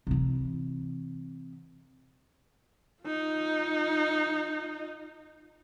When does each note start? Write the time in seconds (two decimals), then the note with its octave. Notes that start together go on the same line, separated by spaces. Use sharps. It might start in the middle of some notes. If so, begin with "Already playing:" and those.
0.07 C3 E3
3.03 D#4 F4